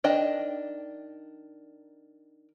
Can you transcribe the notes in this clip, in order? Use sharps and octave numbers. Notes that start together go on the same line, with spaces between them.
D#3 D4 D#5 G5